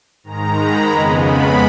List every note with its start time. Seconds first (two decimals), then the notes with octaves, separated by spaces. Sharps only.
0.24 G#2 D#3 G#3 A#5
0.57 B5
0.91 F2 C#3 G#3 B3
1.26 B5